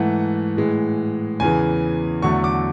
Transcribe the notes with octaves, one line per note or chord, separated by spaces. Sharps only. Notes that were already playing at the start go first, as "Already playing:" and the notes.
Already playing: G#2 E3 A3 F#5
A2 E3 G#3
E2 C#3 E3 G#5
E2 D3 F#3 A3 C#6
D6